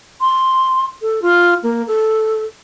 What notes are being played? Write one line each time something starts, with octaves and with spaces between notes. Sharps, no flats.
C6
A4
F4
A#3
A4